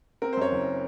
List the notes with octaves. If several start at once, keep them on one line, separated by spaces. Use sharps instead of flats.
C4 A#4
C5
F#2 C#5
F#1